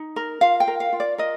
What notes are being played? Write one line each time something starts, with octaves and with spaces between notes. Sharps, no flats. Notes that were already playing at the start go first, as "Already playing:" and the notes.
Already playing: D#4
A#4
F4 F5
G5
A#4
F5
F4
D5
A#4 D#5